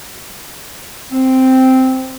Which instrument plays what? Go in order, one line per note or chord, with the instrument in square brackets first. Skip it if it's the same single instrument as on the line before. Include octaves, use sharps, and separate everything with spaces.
[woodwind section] C4